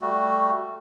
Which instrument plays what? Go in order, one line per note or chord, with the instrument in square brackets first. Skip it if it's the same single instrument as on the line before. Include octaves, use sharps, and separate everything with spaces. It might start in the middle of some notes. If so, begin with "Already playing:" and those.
[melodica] G3 A3 F#4